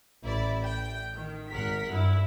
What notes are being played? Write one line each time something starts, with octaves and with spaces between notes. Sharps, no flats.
A1 E4 D5
G5
D#3
G#1 A#4 F#5 B6
G2 E4